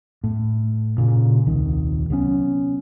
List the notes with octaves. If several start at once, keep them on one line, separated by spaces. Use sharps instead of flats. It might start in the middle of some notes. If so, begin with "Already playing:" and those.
A2
A#2 C#3
D#1 C2 D#3
C3 F#3 B3 C#4